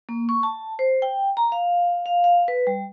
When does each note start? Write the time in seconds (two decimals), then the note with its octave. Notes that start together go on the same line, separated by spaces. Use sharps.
0.09 A#3
0.29 C#6
0.43 A5
0.79 C5
1.02 G5
1.37 A#5
1.52 F5
2.06 F5
2.24 F5
2.48 B4
2.67 G3